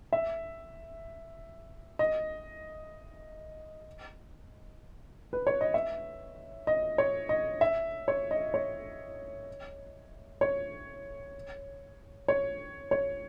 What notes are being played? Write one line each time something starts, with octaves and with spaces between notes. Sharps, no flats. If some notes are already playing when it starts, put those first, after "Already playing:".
E5
D#5
B4
C#5
D#5
E5
D#5
C#5
D#5
E5
C#5
D#5
C#5
C#5
C#5
C#5